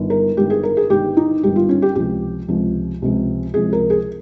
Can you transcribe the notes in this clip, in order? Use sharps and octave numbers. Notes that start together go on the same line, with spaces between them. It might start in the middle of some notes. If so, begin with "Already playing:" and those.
Already playing: G1 G2 D#3
A#4
G1 G2 D#3 G4
G#4
A#4
G#4
G1 G2 D#3 G4
D#4
G1 G2 D#3 G4
F4
C#4
G4
C#2 C3 F3 G4
C#2 C3 F3
C#2 C3 F3
C#2 C3 F3 G#4
A#4
G#4